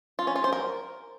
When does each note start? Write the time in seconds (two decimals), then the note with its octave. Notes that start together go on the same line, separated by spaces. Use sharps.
0.19 F4
0.27 C#4
0.36 F4
0.44 C5
0.53 A#4